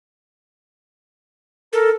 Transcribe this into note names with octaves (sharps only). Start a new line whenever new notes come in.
A4 A#4